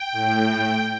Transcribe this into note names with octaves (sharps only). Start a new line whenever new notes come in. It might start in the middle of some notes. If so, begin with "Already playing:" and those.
Already playing: G5
A2